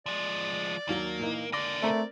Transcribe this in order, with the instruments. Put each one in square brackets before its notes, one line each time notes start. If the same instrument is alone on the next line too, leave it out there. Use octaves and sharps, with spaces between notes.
[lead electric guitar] F3 G#3 [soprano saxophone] D5
[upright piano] D#2 F#3 G7 [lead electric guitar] A#3
[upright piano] A#2 E3 D#4
[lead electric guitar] D3 A#3 [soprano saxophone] D5 [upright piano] D6 A#6
[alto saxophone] A3 [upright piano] C4 A#4